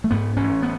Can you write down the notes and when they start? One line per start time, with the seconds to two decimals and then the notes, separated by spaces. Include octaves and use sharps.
0.04 A3
0.11 G#2 B3
0.37 A1 C#4
0.63 B3